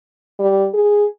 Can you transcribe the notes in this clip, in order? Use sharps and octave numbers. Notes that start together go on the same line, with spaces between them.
G3
G#4